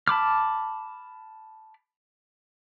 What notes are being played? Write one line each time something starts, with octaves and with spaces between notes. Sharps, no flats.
A5 B5 D6 F6